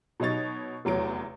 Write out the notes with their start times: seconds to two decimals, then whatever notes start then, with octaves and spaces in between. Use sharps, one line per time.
0.20 B2 F#3 D#4 C#5 A6
0.85 F1 E2 F#3 D7